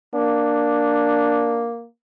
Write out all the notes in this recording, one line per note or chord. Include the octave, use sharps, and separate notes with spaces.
A#3 D4